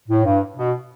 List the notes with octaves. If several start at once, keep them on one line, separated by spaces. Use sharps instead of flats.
A2
G2
B2